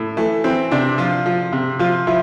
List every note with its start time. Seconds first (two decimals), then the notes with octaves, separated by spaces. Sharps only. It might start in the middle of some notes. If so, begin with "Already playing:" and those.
Already playing: A2
0.17 E3 A3
0.44 E3 C4
0.71 C3 D4
0.98 F3 F4
1.26 F3
1.53 C3
1.79 F3 F4
2.07 F3 E4